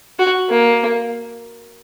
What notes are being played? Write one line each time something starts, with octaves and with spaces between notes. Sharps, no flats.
F#4
A#3